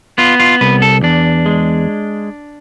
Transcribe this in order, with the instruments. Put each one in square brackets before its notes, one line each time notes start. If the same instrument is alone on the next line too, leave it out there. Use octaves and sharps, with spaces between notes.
[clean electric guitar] B3 F4
F4
C2 B4
A4
E2 D4
G#3